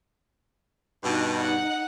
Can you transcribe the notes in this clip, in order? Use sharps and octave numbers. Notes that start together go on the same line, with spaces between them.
G2 B2 D#4
F#5